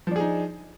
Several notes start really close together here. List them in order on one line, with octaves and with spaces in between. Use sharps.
F3 D4 G#4 D#4